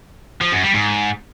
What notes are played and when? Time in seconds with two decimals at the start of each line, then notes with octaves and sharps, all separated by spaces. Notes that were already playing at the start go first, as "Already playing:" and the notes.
0.41 F3
0.52 F#2
0.63 G3
0.74 G#2